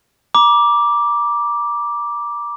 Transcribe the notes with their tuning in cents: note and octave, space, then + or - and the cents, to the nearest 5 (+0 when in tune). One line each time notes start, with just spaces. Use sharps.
A#5 +40 D6 +0